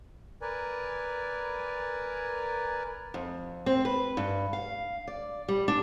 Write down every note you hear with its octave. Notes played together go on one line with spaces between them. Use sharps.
A#4 B4 D5 G#5
F2
C4
B4
G2
F5
D5
G3
D4